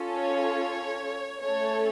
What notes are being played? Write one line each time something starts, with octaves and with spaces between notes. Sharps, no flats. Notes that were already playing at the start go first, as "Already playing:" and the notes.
Already playing: C#4 F4 A4
C#5
A3 C#4 A4 C#5